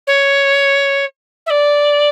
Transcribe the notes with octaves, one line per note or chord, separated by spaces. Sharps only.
C#5
E5
D5